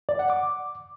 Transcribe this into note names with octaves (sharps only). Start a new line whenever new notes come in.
D5
F#5
D6